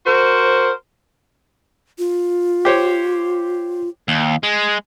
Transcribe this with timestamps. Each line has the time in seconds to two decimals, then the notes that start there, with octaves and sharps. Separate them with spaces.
0.06 F#4 A#4 C5
1.99 F4
2.65 G4 C5 C#5
4.08 D#2
4.43 G#3